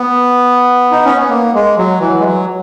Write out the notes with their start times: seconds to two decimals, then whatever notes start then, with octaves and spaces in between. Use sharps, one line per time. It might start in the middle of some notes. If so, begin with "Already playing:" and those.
Already playing: B3
0.91 D#4
1.05 C#4
1.18 B3
1.30 A#3
1.54 G#3
1.78 F#3
2.00 E3
2.19 G#3
2.24 F#3